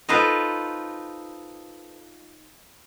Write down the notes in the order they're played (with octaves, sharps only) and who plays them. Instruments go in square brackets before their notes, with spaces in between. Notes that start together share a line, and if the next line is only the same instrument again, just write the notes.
[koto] D#4 F4 A4 B4 C5